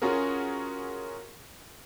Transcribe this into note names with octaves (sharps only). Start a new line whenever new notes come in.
C#4 F4 F#4 G#4 A#4